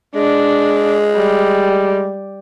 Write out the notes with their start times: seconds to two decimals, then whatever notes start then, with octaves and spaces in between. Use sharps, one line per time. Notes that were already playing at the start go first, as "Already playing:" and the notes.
0.15 G#3 D4
1.16 G3